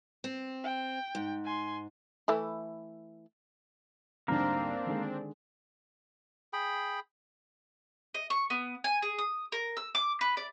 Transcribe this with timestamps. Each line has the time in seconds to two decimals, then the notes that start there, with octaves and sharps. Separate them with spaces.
0.24 C4
0.64 G5
1.15 G#2
1.45 G#5 C6
2.28 E3 A3 E4
4.28 D2 G#2 G3 A#3 C4 D4 A#4
4.86 D3 D#3 G#3
6.53 G#4 G5 B5
8.14 D#5
8.30 C#6
8.50 B3
8.84 G#5
9.02 G#4
9.18 D#6
9.52 A#4
9.77 E6
9.95 D6
10.21 B4
10.37 D5